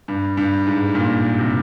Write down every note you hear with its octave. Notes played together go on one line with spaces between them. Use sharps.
G2
G2
G#2
A#2
C3